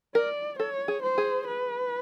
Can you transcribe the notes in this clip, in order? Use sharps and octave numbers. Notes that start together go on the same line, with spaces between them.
A#4 D5
A4 C#5
G#4
C5
G#4
B4